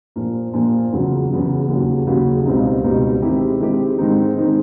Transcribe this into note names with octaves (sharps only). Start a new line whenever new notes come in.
A#2 F3 A#3
A#2 F3 A#3
E2 C#3 F#3
E2 C#3 F#3
D#2 C#3 F#3
D#2 C#3 F#3
C#2 B2 G3 C4 D#4
C#2 B2 G3 C4 D#4
D#3 G#3 C4 E4 G4
D#3 G#3 C4 E4 G4
G#2 D#3 G#3 C4 D#4
D#3 G#3 C4 D#4